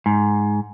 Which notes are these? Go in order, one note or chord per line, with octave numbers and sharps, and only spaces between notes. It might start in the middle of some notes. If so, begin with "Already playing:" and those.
G#2